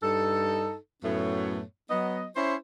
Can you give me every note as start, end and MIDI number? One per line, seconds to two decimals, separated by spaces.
0.03 0.76 43
0.03 0.76 63
0.03 0.76 69
1.04 1.62 42
1.04 1.62 45
1.04 1.62 57
1.04 1.62 59
1.04 1.62 73
1.91 2.26 54
1.91 2.26 59
1.91 2.26 75
2.36 2.56 61
2.36 2.56 64
2.36 2.56 72